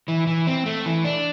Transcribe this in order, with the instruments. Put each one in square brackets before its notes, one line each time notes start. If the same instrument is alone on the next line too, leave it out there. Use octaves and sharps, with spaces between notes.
[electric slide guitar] E3
E3
C4
A3
E3
D4